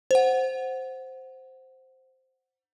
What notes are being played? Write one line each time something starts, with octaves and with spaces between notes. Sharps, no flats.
C5 F#5